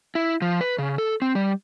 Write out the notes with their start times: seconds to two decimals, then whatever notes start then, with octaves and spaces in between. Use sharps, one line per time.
0.15 E4
0.42 F3
0.61 B4
0.79 C#3
0.98 A4
1.22 C4
1.35 G3